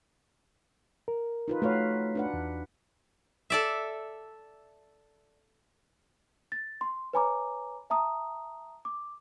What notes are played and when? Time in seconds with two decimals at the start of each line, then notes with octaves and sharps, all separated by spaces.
1.08 A#4
1.48 D#4 F4 B4
1.62 A3 F#4 B4 C#5 F5
2.15 D4 B4 F#5
2.33 E2
3.50 A4 D5 E5
6.52 A6
6.81 C6
7.13 B4 C#5 G#5 A#5 B5 D6
7.90 E5 A5 A#5 D#6
8.85 D6